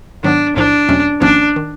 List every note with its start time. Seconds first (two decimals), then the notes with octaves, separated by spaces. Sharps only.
0.24 G#2 D#3 F#3 B3 D4
0.56 B1 A2 F3 D4
0.89 E2 B2 F#3 A3 C#4
1.21 G#1 G#2 F3 A#3 C#4 D4
1.56 D#3